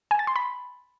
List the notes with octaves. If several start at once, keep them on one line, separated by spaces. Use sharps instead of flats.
G#5
A6
C6
B5